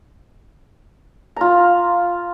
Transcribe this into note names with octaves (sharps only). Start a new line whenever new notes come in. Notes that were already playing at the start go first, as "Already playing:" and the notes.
F4 A#5